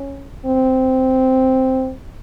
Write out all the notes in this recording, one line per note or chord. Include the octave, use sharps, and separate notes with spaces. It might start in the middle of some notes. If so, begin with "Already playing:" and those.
Already playing: C#4
C4